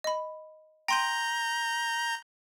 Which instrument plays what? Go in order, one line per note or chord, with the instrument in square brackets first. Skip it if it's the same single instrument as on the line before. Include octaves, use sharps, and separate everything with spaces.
[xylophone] D#5 B5
[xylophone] G5 C6 D#7 [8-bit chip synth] A#5 G6